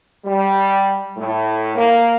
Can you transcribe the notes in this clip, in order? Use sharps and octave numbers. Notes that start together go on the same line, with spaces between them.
G3
A2
A#3